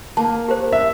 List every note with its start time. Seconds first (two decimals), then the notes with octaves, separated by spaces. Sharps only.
0.17 A#3 A5
0.48 G4 A#4 C5
0.73 E5